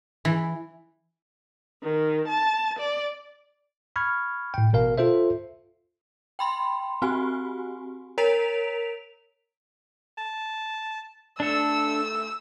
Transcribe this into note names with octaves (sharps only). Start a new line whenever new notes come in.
E3
D#3
A5
D5
B5 C#6 F6 G#6
A2 G5
A1 B2 A#4 F5
F4 A4 C5 E5
G5 B5 C6
C4 F#4 G4 G#5
A#4 C#5 A#5 B6 D7 F7
A5
A3 D4 A4 E6